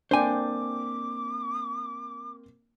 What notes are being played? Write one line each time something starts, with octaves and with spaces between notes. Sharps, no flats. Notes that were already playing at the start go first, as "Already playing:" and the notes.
A#3 C4 D4 C5 G5 G#5 D6